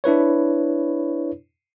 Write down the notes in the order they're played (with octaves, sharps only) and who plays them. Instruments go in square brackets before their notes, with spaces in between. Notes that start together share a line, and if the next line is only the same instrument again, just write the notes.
[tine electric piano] D4 E4 B4 C#5